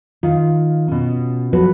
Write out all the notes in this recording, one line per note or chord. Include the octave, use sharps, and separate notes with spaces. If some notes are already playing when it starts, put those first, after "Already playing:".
D#3 F4 F5
B2 C#4
F3 F#3 F#4 A4 B4